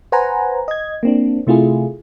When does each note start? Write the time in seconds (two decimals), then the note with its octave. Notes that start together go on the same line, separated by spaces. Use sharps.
0.12 B4 C5 F#5 G#5 A#5
0.68 D#5 G#6
1.03 A#3 C4 D4
1.47 C3 A3 E4 F4 G#4